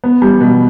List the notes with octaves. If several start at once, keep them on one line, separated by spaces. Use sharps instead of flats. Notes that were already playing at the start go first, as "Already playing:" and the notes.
B3
G3
B2